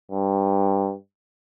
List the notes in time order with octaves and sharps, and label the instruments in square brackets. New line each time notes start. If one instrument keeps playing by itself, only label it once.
[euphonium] G2